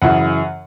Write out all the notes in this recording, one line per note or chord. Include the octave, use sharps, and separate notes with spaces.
F#2 C#3 E3 F#5